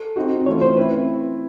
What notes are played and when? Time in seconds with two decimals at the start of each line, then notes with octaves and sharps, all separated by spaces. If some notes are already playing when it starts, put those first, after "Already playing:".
Already playing: A4
0.16 C4 D#4 F#4
0.46 E3 A3 C#4 F4 C#5
0.62 C5
0.77 C4 E4 B4